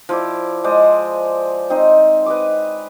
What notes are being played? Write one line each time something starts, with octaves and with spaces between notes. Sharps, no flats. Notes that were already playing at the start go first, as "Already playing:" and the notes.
F3 E4 D5
G#3 C5 D5 D#5
C4 D#4 D#5 C6
B4 D#5 D6